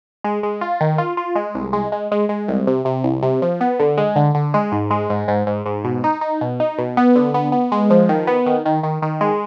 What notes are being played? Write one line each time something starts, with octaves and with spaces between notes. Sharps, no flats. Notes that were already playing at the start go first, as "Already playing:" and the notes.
G#3
G#3
F4
D#3
F4
F4
G#3
C2
G#3
G#3
G#3
G#3
C2
C3
C3
C2
C3
F3
B3
D3
G#3
D3
D3
G#3
G#2
G#3
G#2
G#2
G#2
G#2
B2
D#4
D#4
B2
D#4
B2
B3
D3
B3
B3
G#3
F3
D#3
B3
D#3
D#3
D#3
D#3
G#3